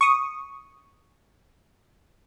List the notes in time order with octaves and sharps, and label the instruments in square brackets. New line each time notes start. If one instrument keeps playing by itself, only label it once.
[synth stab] C#6 D#6